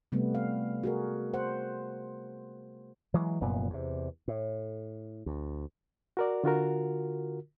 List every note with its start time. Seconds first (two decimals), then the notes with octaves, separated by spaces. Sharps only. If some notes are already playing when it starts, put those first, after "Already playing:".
0.12 C3 G3 A3 B3
0.35 F5
0.84 F#4 G#4 A#4
1.34 C5 F#5
3.14 E3 F#3 G#3
3.40 F1 F#2 A#2 B3
3.70 E2 C3
4.28 A2
5.26 D2
6.17 F#4 A#4 D5
6.44 D3 F4 F#4 A#4